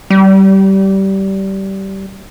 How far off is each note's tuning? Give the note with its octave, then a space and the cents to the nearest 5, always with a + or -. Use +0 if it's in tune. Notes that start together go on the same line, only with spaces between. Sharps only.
G3 -20